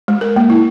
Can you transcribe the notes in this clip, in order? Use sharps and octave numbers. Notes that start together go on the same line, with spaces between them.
G#3
A#4
A#3
E4